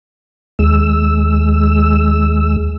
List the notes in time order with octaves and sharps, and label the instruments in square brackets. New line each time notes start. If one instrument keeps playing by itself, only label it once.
[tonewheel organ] D#2 G#3 E6